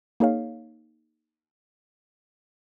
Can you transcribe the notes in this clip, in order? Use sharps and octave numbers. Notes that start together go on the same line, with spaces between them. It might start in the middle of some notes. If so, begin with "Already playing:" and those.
A#3 D#4 G#4 C#5 F5